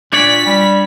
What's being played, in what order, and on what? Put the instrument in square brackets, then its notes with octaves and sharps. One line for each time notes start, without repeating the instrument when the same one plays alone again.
[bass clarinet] A#2 [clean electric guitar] D4 C#5 D5 [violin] B6
[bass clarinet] G3